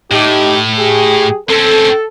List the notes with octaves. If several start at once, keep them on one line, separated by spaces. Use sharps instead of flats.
A2 D#4 G4
G4 G#4
C4 C#4 A4